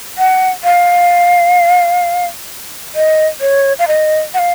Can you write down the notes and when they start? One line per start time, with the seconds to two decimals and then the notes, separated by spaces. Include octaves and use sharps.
0.18 F#5
0.64 F5
2.95 D#5
3.41 C#5
3.79 F5
3.88 D#5
4.34 F#5
4.39 F5